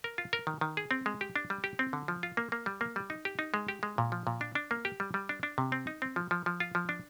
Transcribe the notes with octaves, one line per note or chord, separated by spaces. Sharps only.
A#4
F4
A#4
D#3
D#3
G#4
C4
G#3
G4
D4
G3
G4
C4
D3
F3
F4
A#3
A#3
G3
A#3
G3
D#4
G4
D#4
G#3
G4
G#3
A#2
F3
A#2
D4
D4
A#3
G4
G3
G3
D4
D4
C3
C4
D#4
C4
F3
F3
F3
F4
F3
D4